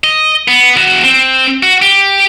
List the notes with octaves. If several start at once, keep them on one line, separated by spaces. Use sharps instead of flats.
D#5
B3
E2 F#4
C4
F#4
G4